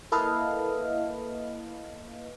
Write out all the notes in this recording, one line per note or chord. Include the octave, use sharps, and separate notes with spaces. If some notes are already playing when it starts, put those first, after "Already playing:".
A#3 E4 A4 B4 D#5 F5